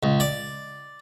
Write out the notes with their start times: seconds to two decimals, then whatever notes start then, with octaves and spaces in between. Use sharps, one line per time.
0.03 C#2
0.20 D5